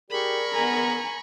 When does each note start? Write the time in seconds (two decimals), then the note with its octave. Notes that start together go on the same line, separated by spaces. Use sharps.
0.10 G4 G#4 A#4 D5 B5 C#6
0.52 B3 G#5 A#5